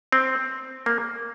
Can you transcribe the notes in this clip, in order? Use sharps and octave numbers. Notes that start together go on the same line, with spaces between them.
C4
A#3